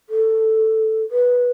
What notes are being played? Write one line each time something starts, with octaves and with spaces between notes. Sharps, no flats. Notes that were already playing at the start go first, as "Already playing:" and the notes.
A4
B4